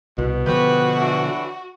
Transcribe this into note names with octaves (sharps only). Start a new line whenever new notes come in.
C2 B2
D3 F3 B3 F#4 G4 B4
A2 E3 D4